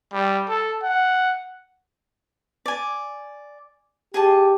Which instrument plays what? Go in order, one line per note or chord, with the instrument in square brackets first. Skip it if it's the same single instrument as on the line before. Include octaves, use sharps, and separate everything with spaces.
[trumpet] G3
A4
F#5
[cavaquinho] D5 G#5
[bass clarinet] G4 [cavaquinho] G#4 D#5 A5